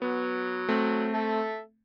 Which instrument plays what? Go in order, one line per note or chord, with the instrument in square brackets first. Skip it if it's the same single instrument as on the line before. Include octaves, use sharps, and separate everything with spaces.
[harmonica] F#3 [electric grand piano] B3
[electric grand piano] A3 C4
[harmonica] A4 E5